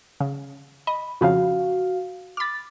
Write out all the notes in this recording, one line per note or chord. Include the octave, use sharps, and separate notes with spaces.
C#3
D#5 B5
F2 C#3 F3 F#4 F5
B5 D6 F6 A6